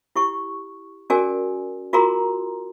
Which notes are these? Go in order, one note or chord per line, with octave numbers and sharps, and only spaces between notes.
E4 G4 C#6
C#4 F#4 G#4 A#4 D5 G#5
F4 F#4 G#4 A#4 A#5 C6